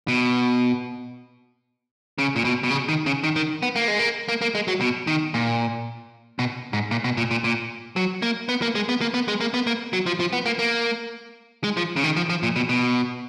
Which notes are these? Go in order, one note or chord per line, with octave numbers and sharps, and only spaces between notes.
B2
C#3
A#2
B2
B2
C#3
D#3
C#3
D#3
D#3
B3
A#3
G#3
A#3
A#3
A#3
G#3
F#3
B2
D#3
A#2
B2
G#2
A#2
B2
A#2
A#2
A#2
F#3
A#3
B3
A#3
G#3
B3
A#3
B3
G#3
A#3
B3
A#3
F#3
F3
F3
B3
A#3
A#3
G#3
F3
C#3
D#3
F3
F3
A#2
B2
B2